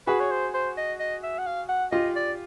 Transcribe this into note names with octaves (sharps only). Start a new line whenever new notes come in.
F#4 G#4 B4
C#5
C5
C5
D#5
D#5
E5
F#5
F5
F#5
F4 G4 D#5
D5